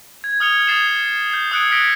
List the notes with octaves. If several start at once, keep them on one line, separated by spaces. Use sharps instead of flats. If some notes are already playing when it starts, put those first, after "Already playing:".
G#6
D#6 F6 C#7 F7
D#6 G#6 A6 C7 E7
G6 C7
D#6 E6 F#6 G#6 C#7 D7
F6 F#6 G#6 A#6 B6 D7